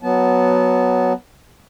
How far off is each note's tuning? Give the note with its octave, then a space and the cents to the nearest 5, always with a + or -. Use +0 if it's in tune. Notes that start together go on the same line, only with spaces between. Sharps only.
F#3 +0 B3 +0 A5 -25